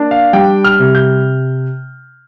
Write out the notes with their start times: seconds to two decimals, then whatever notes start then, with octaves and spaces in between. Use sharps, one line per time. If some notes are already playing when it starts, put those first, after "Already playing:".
Already playing: A#3 D4
0.11 F5
0.33 G3 G5
0.64 F6
0.79 C3
0.95 G6